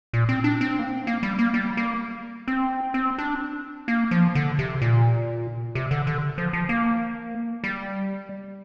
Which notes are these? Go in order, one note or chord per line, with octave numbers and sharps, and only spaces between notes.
A#2
C4
D4
C4
A#3
C4
A#3
G3
A#3
G3
A#3
C4
C4
D4
A#3
F3
D3
C3
A#2
C3
D3
D3
F3
F3
A#3
G3